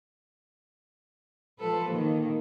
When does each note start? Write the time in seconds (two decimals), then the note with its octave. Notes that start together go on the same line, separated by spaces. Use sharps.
1.59 F3 A4 B4
1.89 D#3 A#3